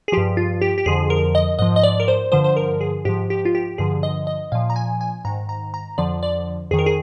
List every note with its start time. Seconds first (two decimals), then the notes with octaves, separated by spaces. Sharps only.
0.08 G#4
0.12 G2 F3 G4
0.37 F4
0.62 G4
0.78 G4
0.86 F2 D3 F3 G#4
1.10 A#4
1.35 D#5
1.59 G#2 F3 D#5
1.76 D#5
1.83 D5
2.00 A#4
2.08 C5
2.32 G2 D3 F3 C5
2.44 C5
2.57 A#4
2.81 G#4
3.05 G#2 F3 G4
3.30 G4
3.45 F4
3.55 G4
3.78 G2 D3 F3 G#4
4.03 D#5
4.27 D#5
4.52 A#2 F3 F5
4.70 A#5
4.76 G#5
5.01 G#5
5.25 G#2 D#3 A#5
5.49 A#5
5.74 A#5
5.98 F2 D3 F3 D5
6.23 D5
6.71 F2 D#3 G#4
6.79 A#4
6.86 G#4